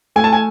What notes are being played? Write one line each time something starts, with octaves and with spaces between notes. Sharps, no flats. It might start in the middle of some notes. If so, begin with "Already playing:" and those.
A3 G#5
A5
G#5